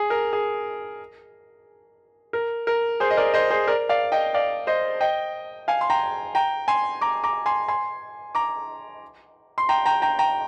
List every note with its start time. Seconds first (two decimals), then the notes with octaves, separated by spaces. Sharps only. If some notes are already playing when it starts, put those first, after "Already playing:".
Already playing: G#4
0.10 A#4
0.33 G#4
2.33 A#4
2.67 A#4
3.00 G#4 C5
3.11 D#5
3.17 A#4 D5
3.34 C5 D#5
3.50 G#4 C5
3.67 A#4 D5
3.89 D5 F5
4.12 D#5 G5
4.34 D5 F5
4.67 C5 D#5
5.01 D#5 G5
5.68 F5 G#5
5.81 C6
5.90 G5 A#5
6.35 G5 A#5
6.68 G#5 C6
7.01 A#5 D6
7.24 A#5 D6
7.46 G#5 C6
7.68 G#5 C6
8.35 A#5 D6
9.58 C6
9.69 G5 A#5
9.86 G5 A#5
10.02 G5 A#5
10.19 G5 A#5